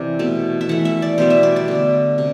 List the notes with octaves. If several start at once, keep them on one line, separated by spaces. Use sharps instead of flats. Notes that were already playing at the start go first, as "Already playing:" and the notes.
Already playing: C3 E3 E4 D5
B2 A3
E5
E3 A3 F#5
E5
D5
B2 G3 B3 C5
E5
D5
D5
D3 A3
C3